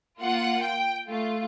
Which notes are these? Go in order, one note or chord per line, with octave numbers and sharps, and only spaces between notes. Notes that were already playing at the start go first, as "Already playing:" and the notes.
A#3 F4 F#5
G5
A3 F4